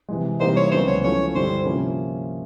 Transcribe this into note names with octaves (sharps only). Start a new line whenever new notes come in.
C3 E3 G#3
C3 E3 G3 A#3 D#4 C5
C#5
C#2 C#3 F#3 B3 D4 C5
C#5
F3 A3 C#4 E4 C#5
G2 D3 G3 C4 E4 C5
C3 F3 A#3 C#4